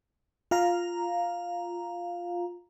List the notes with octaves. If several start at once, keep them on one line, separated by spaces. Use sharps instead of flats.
F4 F5 A#5